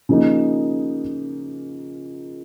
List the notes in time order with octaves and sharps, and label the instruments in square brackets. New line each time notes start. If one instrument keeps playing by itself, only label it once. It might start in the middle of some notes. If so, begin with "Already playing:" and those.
[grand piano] C#3 F3 A#3 D#4